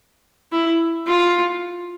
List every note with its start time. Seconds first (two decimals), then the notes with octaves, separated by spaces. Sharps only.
0.52 E4
1.07 F4